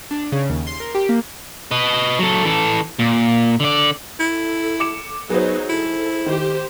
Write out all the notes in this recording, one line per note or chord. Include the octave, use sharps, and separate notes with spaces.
D4
C#3
D#2
C6
A#4
G4
A#3
B4 D#5
F#3 A4
E3 A4
A#2
D3 D5
E4 A4
D6 C#7 E7
F#3 B3 D#4 G#4 C5
E4 A4
D#3 G4 C5